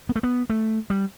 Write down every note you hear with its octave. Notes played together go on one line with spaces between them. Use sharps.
B3
A3
B3
A3
G3